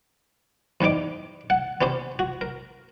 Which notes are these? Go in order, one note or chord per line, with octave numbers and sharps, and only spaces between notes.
E2 G#2 G3 D#4 D6
F#5
B3 C#4 G4 C5
F#4
A#4